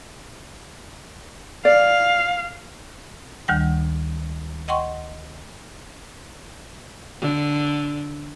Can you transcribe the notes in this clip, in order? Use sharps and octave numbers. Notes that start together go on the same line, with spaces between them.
D5 F5
D2 D#3 G3 F#5 G5
D#5 F#5 G5 C6 C#6
D3